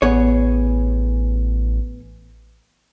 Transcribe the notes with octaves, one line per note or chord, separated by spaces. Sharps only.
A1 B3 G#4 C#5